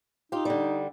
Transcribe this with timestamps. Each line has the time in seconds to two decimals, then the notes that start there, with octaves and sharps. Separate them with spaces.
0.32 D#4 F4 G4
0.45 D3 G3